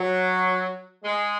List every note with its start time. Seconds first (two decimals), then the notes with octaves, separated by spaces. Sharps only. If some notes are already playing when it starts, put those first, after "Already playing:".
Already playing: F#3
1.04 G#3